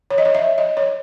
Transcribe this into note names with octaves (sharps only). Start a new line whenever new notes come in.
C#5
D#5
C#5
E5
D#5
C#5